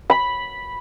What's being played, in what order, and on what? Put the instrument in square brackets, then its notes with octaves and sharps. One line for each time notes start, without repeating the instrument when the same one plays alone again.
[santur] B5